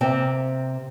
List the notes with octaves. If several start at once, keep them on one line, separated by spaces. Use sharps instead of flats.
C3 A#3 C4